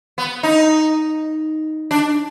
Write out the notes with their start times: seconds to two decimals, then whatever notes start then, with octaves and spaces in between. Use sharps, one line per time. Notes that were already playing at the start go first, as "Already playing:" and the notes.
0.18 B3
0.43 D#4
1.91 D4